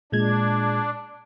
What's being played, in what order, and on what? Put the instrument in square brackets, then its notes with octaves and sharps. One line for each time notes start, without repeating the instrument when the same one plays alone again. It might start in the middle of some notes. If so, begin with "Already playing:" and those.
[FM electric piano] A#2 G#3 G#6 [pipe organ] D4